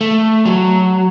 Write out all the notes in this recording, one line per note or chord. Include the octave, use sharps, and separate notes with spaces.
A3
F#3